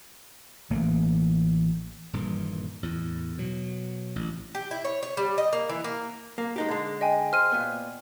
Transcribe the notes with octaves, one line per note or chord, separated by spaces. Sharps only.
A1 E3 A3 A#3
D#1 G2 A#2 E3
E2 A2
B2 F#3
A1
G4
E4
C#5
C#5
G3
D#5
A#3
E3
A#3
A#3
G#3 D#4 G4
D3 G#3
D#5 G5 G#5
C5 F6 D#7
A#2 B3